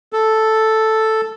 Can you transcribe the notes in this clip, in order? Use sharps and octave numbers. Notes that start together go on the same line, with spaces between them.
A4